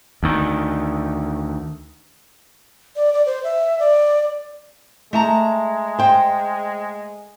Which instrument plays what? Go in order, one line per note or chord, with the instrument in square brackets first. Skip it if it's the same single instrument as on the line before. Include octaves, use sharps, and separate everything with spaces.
[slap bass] D2 D#3
[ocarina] D5
D5
C5
E5
D5
[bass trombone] G#3 [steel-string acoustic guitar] A3 A5 A#5
[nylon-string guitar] C5 G5